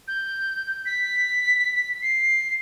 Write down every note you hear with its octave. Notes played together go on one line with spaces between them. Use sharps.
G6
B6
C7